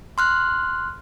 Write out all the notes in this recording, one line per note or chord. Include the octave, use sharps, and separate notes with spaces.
C6 F6 F#6